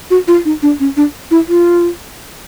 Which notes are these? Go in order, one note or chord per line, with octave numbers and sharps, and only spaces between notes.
F#4
F4
D#4
D4
C#4
D4
E4
F4